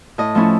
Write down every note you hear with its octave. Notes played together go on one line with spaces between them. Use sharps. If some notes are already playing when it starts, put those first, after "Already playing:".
A2 D#5
F3 A3 C#4 E4